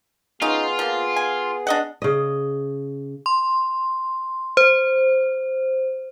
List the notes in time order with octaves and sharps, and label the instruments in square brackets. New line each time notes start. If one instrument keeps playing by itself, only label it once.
[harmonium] B3 G#4 [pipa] C#4 D#4 [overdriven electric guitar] F4
[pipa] F3 A#3
G#5
D4 D#5 F#5
[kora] C#3 D#5
[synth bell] C6
C5